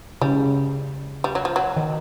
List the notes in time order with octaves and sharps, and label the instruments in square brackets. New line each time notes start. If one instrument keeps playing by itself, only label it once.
[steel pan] C#3 [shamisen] G3
[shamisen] G3
F#3
F3
F#3
[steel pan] D#3